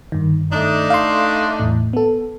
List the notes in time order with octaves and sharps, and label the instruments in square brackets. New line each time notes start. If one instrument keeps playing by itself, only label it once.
[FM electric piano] G2 D#3
[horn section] A3 D4 D#4
[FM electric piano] F5 C6
E2 A2
B3 A4